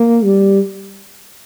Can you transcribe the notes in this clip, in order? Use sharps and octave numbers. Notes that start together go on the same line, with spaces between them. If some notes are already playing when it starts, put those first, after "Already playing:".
Already playing: A#3
G3